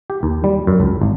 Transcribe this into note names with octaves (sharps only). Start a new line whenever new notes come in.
G4
D#2
G3
F#2
C#2
G#1